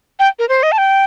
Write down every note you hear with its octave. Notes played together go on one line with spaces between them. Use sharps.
G5
A#4
C5
D#5
A5
G5